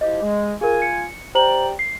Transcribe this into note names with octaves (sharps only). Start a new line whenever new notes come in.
F3 E4 G4 D#5
G#3
F4 G#4 A#4 G#5
C#7
G4 C5 D5 G5 A#5 F#7
C7